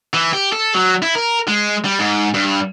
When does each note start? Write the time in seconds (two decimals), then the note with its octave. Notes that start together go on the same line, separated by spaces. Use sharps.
0.14 E3
0.33 G4
0.53 A4
0.74 F#3
1.02 E4
1.15 A#4
1.48 G#3
1.85 G3
1.99 G#2
2.34 G2